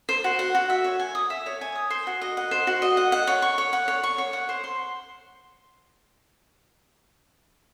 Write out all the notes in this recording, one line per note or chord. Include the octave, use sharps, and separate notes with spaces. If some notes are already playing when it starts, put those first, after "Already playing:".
C5
F#4
F#5
F#4
E5
C#5
G#5
D#6
E5
C#5
G#5
D#6
C5
F#4
D#5
F#5
C5
F#4
D#5
F#5
F#5
C#5
C#6
C#5
F#5
C#5
C#6
C#5
F#5
C5
C6